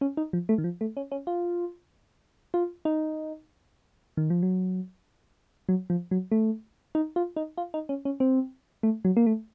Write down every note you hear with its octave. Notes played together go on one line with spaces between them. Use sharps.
C#4
D#4
F3
A3
D#3
F3
A3
C#4
C#4
F4
F4
D#4
D#3
F3
F#3
F#3
F3
F#3
A3
D#4
F4
D#4
F4
D#4
C#4
C#4
C4
A3
F#3
A#3
A3